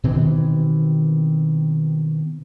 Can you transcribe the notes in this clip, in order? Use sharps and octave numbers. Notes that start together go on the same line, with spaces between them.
B2 D#3 E3 C4